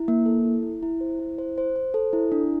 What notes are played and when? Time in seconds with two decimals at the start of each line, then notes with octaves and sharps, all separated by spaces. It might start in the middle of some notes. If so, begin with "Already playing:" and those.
Already playing: E4
0.08 A#3
0.26 A4
0.45 E4
0.63 E4
0.83 E4
1.01 C5
1.19 E4
1.38 C5
1.58 C5
1.76 C5
1.94 A4
2.13 E4
2.32 D4